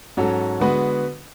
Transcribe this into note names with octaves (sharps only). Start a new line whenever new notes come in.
G#2 F#3 C#4 F#4 A4
D3 G#3 B3 F#4 B4